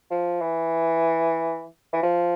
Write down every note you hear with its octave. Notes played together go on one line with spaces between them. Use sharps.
F3
E3
E3
F3